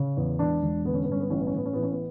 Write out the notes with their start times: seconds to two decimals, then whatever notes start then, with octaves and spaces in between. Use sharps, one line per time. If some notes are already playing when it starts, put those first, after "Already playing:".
Already playing: C#3
0.17 E2
0.39 E1 D4
0.63 E1
0.85 D3 B3
0.94 C#4
1.03 B3
1.08 G2 C#4
1.20 B3
1.30 A1 C#4
1.39 B3
1.47 C#4
1.54 A1 B3
1.65 C#4
1.73 E3 B3
1.83 C#4
1.91 B3